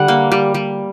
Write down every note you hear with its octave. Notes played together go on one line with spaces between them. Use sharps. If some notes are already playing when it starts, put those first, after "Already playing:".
Already playing: D3 G3 F#5
A#3
G3
G3